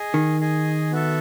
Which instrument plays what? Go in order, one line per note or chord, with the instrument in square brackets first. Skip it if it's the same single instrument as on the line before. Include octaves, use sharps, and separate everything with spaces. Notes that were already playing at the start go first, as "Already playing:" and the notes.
Already playing: [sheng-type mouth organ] G#4 D#5 G#5
[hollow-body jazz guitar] D#3
[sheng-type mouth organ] G#4 D#5 G#5
B3 F#4 A4 E5